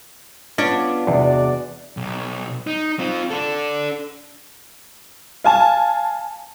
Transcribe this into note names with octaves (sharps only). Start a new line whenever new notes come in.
B3 C#4 D4 F4
E2 C3 E3 G#3 B3 F#4 D5
B1
D#4
C4 F4
D4 A4
F5 G#5 A5